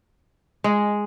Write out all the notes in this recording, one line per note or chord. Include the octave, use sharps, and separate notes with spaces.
G#3